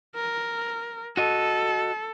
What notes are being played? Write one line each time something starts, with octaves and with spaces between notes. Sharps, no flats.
A#4
F#4 A4 D#5